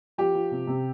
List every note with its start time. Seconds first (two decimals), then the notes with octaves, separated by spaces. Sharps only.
0.18 F3 G4
0.35 F3
0.51 C3
0.67 C3